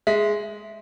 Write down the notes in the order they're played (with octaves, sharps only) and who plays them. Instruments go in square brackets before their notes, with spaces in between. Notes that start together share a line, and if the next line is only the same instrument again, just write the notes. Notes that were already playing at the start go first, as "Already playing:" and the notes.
[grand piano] G#3 [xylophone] E5